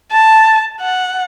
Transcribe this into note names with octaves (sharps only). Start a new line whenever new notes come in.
A5
F#5